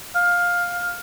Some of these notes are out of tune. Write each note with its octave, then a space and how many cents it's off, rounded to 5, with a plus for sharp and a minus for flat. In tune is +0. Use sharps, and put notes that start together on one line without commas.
F5 +10